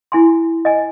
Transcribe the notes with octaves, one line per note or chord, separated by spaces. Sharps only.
E4 G#5 C6
D#5 G#5